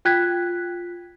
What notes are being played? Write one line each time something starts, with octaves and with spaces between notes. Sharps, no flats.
F4 G5 F#6 G#6 B6